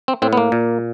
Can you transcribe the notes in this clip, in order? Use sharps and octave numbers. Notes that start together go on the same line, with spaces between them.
C4
A2 C4
B3
A#3
A#2